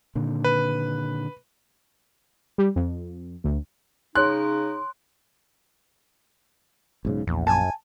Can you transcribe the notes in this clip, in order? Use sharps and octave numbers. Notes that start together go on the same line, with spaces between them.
A#2 D3 D#3
B4
G3
F2
D2
C#3 D#4 C#5 C6 F#6
B1 G#2 C#3
A#1 E2
F#2 G#5 A5